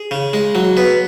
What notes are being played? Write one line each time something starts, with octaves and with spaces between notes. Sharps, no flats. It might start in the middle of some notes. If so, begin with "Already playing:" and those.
Already playing: G#4
C#3
G#3
F#3
B3